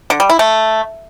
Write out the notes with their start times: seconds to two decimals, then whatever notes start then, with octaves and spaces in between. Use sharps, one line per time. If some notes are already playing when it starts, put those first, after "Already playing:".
0.10 D3
0.20 G3
0.29 E4
0.39 A3